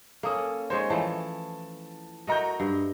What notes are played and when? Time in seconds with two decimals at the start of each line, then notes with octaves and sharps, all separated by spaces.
0.23 A#3 C#4 A4 D#6
0.70 G#3 D#4 C5 C#5
0.90 E3 F3 A3 A5
2.27 A3 F#4 A#4 D#5 A#5 G6
2.60 G2